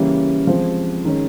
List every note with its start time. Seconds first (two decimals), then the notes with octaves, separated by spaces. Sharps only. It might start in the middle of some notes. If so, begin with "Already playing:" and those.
Already playing: C#3 E3 G3 A#3 C#4
0.47 F3 G#3 C4
1.05 D#3 G#3 C#4